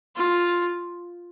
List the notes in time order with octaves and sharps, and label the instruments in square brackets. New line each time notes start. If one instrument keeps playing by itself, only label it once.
[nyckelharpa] F4